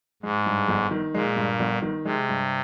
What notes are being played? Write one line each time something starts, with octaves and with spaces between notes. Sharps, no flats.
G#2 G#3
G2
G1
D#3
A#2 G#3
G2
G1
D#3
C3 G#3
G2